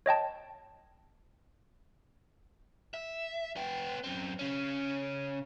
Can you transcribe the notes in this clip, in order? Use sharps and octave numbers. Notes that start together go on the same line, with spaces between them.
C#5 D#5 G5 A5
E5
B3 G5
F#2 C4
C#3 C#4